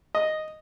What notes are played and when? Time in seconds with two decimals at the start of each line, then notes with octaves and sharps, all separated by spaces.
0.15 D#5